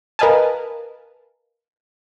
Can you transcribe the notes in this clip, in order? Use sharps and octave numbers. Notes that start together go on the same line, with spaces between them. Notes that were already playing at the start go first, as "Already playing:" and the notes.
A#4 B4 D#5 F5 G#5 A5